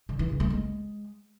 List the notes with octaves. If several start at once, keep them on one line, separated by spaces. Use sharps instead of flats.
D3
E3
C#3
A3
G#3